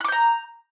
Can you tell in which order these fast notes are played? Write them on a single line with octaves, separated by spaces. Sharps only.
F#6 D6 G6 A#5